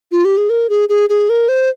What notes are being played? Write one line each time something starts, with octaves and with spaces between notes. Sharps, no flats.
F4
G4
G#4
A#4
G#4
G#4
G#4
A#4
C5